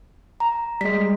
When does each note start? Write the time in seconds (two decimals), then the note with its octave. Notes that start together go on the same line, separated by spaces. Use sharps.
0.40 A#5
0.81 G3 G#3 B6